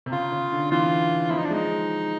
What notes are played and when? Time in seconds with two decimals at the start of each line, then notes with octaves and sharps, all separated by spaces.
0.06 C3
0.12 C#3 F4
0.32 C#3
0.52 D3
0.71 E3 F4
1.30 F3 E4
1.39 D#4
1.45 D4
1.50 G#3 D#4